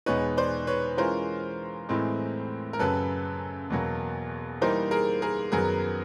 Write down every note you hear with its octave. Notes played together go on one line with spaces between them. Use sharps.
E2 B2 G#3 B3 D#4 B4 C#5
C5 D5
B4 C#5
E3 G#3 C#4 F4 A#4 C5
A2 E3 G#3 C4
A#4
F#2 C#3 F#3 A4 B4
E2 B2 F#3 A#3
E3 G3 A#3 D#4 A#4 C5
G#4 A#4
G#4 A#4
F#2 D#3 F#3 B3 G#4 A#4